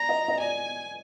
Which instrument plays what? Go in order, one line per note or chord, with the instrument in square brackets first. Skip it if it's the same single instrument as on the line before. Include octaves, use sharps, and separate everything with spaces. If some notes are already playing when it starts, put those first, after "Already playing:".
Already playing: [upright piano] D5 [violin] A#5
[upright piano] D#5
D#5
[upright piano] D5 [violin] G#5